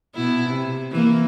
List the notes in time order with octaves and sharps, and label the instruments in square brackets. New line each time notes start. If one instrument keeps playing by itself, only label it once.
[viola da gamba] B2 E4
C3
E3 A#3